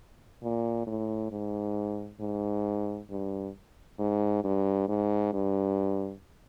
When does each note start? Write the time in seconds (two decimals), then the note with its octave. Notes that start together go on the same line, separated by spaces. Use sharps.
0.43 A#2
0.87 A2
1.31 G#2
2.20 G#2
3.10 G2
3.99 G#2
4.44 G2
4.88 G#2
5.33 G2